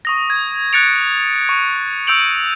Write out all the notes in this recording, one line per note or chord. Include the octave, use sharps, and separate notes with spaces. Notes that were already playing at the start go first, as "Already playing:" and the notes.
C#6 D#6 A#6
G#6
F#6 G#6 A6 C#7 D7 F7
C#6
C#6 E6 G6 D7 F7 F#7